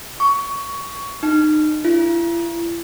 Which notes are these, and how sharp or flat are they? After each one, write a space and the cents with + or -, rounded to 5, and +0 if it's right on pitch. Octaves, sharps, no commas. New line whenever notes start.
C#6 +15
D#4 -25
E4 +45